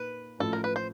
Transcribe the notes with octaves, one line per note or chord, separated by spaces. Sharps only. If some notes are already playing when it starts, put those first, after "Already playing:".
Already playing: A#2 A#3 D#4 B4
A1 A2 F3 A4
A#4
B4
C5